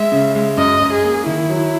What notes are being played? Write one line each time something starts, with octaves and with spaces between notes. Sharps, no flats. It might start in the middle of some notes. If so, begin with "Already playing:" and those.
Already playing: G#3 E5
C#3
G#3
F#2 D#5
F#2
G#4
A#3
D#3 E4
F#3